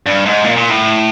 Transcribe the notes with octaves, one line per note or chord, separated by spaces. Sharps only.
G2
G#2
A#2
A#2
A2